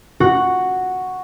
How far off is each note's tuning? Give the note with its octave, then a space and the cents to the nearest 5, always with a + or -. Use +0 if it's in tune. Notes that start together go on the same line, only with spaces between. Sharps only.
F#4 +0